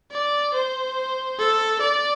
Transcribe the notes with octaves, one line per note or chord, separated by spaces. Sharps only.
D5
C5
A4
D5